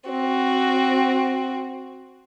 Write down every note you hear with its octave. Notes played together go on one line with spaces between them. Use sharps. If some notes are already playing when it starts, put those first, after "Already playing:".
C4 F#4